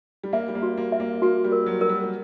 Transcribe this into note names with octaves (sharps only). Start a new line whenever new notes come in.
G3
A#3 E5
G3
A#3
F#4
A#3
E5
A#3
A#3 F#4
G3
A#4
F#3
A#4
G3
G3